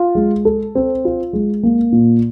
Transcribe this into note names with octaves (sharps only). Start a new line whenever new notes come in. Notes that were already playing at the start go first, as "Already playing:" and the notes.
Already playing: F4
G#3
A4
C4
F4
G#3
A#3
A#2